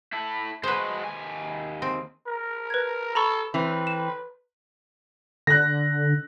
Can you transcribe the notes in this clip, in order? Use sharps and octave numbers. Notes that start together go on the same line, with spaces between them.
E4 A4
G#3 F#4 B4 C5
D#2 G#5
C4
A#4
B4 G#6
A4 A#5 B5 C#6
E3 C4 B4
E7
D3 F#6 A#6